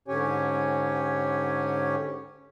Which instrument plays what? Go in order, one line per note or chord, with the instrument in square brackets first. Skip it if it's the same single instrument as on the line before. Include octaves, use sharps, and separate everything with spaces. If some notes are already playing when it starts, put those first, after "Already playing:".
[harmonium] G#2 D3 C#4 G4 C#5 G#5